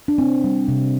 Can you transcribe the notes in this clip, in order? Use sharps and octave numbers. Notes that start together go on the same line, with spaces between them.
D4
C3 C4
G3
C3